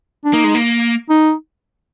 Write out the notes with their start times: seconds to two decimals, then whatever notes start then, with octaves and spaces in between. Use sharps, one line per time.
0.24 D4
0.33 A#3 D#4
0.44 G#3
0.55 A#3
1.10 D#4